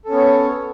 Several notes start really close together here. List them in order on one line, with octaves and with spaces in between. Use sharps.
A4 C#4 B3 C#5